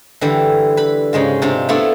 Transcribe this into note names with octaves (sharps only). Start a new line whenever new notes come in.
D3 E3 G3
B4 B5
G#2 C#3 G#3 F4
C3 D4 F4
A3 B3 D4 E4 F4 D5